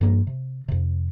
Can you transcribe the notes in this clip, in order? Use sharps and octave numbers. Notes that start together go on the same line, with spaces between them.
G2 F3 A#3
C3
F2 C3